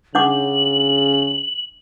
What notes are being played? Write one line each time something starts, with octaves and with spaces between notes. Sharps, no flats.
C#3 D4 F#5 D6 F#7